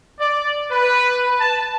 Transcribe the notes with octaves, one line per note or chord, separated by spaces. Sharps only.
D5
B4
A5